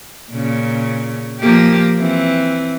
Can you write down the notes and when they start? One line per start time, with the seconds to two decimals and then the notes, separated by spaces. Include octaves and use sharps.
0.31 A#2 C#3
1.40 F3 A#3 G4
1.98 E3 C4